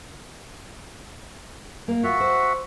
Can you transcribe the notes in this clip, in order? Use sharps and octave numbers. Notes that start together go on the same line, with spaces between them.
A#3
F4 F#4 E5 F#5
C5